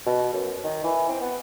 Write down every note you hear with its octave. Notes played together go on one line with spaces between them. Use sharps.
B2
F#2
D#3
E3
C4
B3